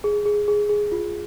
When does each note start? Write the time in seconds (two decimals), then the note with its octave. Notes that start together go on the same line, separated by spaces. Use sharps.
0.04 G#4
0.26 G#4
0.48 G#4
0.69 G#4
0.92 F4